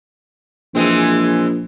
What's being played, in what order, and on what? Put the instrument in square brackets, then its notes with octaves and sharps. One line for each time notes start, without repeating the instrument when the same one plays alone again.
[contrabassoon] A#1 [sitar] E3 G#3 C4